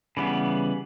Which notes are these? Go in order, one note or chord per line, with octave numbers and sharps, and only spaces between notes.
C#3 E3 G3 B3